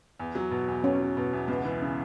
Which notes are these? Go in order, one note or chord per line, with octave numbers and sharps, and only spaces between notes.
E2
F#3
B2
E2
E2 C#4
F#3
B2
E2
C#2 B3
E3
C#3